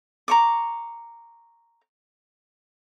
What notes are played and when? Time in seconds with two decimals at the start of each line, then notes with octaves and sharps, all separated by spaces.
0.28 A#5 C#6 D6